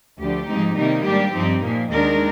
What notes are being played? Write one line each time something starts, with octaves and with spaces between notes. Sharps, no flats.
D2 D3 F3 G4
G#2 F3 G#3 C4 D#4
C3 D#3 G3 A#3 D#4
G#2 G3 A#3 D4 G4
G2 F3 C4 D#4
A#2 F3 A#3
D#2 D#3 G#3 D4 A#4